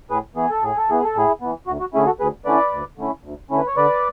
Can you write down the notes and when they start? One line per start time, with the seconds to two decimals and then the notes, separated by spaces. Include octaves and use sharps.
0.10 A2 G#4 B4
0.36 E3 B3 G#4
0.50 A4
0.62 A2 G#4
0.77 A4
0.89 E3 B3 G#4
1.04 A4
1.15 A2 E4 G#4
1.41 E3 B3
1.67 D2 F#4
1.80 F#4
1.93 D3 A3 C#4 E4 G#4
2.06 F#4 A4
2.20 D2 G#4 B4
2.45 D3 A3 C#4 E4 B4 D5
2.72 D2
2.97 D3 A3 C#4 E4
3.24 D2
3.50 D3 A3 C#4 E4
3.58 B4
3.67 C#5
3.76 D3 B4 D5